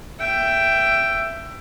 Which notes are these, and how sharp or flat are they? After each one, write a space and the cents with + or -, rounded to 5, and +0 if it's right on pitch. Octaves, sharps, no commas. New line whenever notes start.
E5 +15 G5 +0